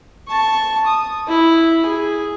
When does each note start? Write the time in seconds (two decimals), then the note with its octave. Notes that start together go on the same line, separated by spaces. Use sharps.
0.28 A5 C#6
0.86 D#6
1.28 E4
1.86 G#4